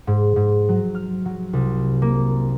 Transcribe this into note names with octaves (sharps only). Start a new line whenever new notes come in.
G#2
G#2
F#3
F6
F#3
C2
A#3